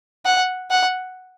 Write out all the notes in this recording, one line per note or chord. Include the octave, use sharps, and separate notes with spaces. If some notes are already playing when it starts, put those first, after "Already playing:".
F#5
F#5